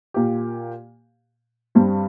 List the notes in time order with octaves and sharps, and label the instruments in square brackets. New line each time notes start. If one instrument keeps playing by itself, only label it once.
[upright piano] A#2 A#3 G4
G2 G3 C4